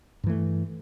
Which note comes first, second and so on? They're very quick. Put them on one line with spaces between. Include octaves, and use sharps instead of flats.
G2 E3 A3